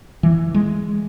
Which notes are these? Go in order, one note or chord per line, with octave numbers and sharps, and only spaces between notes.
E3
G#3